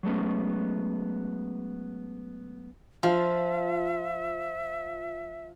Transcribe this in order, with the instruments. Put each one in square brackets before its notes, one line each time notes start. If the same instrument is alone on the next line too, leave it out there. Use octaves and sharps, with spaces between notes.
[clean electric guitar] F#3 G#3 A3 B3 C#4
[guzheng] F3 [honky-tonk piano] F4 [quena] E5